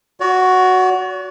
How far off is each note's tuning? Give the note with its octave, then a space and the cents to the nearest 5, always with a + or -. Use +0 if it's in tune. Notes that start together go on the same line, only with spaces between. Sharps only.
F#4 +0 D5 -45